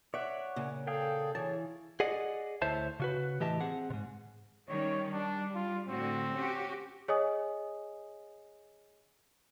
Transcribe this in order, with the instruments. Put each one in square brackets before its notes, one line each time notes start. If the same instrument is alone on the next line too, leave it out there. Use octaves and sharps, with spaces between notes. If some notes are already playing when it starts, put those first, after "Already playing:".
[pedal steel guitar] C#5 D5 F#5 [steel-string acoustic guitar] E5
[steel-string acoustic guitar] A#2 C#3
[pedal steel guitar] G#4 F5 G5 [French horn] A4
[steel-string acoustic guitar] E3 [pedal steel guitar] G#4 A5 [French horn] C#5
[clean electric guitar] G#4 D5 D#5 F#5
D2 E4 C5 C#5 E5 A5
C#3 F#4 B4
A2 E3 G4 D#5 E5 A5
C4 G#4 F#5
G#2 C3
[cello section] D#3 G3 C#4 [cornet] C#5
[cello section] G3 [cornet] D4
[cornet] F4
[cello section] A2 D3 F#4 [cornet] C4
[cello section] C#4 F#4 G4
[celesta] G#4 C#5 D#5 G#5 D#6